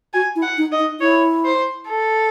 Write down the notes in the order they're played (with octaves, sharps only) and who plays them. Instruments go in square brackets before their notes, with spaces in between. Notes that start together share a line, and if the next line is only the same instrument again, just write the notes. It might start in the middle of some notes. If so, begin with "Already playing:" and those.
[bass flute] F#4 [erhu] G#5
[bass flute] E4
[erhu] F#5
[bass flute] D#4
[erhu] D#5
[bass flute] D#4
[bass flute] E4 [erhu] C#5
[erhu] C5
A4